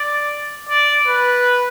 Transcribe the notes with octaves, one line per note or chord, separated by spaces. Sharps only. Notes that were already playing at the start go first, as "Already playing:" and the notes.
Already playing: D5
D5
B4